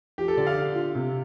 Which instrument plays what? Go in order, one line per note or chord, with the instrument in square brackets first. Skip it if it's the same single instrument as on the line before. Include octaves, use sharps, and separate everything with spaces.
[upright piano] F3 [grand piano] G4
[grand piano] A4
[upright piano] D3 [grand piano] D5
[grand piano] F5
[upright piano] D4
F4
C3